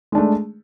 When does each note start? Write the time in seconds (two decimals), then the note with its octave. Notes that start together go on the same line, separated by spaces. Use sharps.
0.12 G#3
0.15 D4
0.18 A3